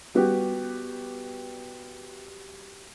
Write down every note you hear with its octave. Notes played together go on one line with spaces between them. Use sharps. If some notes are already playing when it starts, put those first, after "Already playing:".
G3 B3 F#4 G4